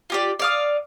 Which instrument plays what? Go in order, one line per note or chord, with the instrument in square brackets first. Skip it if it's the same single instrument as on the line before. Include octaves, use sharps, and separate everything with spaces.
[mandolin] F4 G4 D5
D5 F5 D#6